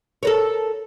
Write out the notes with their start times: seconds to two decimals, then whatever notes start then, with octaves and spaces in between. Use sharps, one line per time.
0.23 A4 A#4 C#5